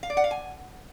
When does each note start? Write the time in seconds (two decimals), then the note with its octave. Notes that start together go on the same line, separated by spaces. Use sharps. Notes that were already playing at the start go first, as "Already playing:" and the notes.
0.03 F5
0.10 D5
0.17 F#5
0.24 F5
0.31 G#5